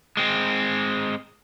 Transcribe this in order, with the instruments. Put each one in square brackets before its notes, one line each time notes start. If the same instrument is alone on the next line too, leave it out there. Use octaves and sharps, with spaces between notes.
[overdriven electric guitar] G#3 C4